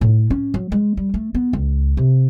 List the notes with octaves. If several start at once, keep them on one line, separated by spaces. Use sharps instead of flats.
A2
C#4
F#3
G#3
G3
A3
B3
C#2
C3